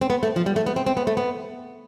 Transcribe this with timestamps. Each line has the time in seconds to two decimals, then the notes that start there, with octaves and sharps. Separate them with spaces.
0.01 C4
0.10 B3
0.23 A3
0.36 F3
0.46 G3
0.56 A3
0.66 B3
0.76 C4
0.86 C4
0.97 B3
1.07 A3
1.17 B3